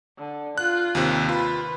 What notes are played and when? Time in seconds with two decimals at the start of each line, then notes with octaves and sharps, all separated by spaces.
0.19 D3
0.58 F4 F#6
0.95 D#2 C3
1.29 F4 B4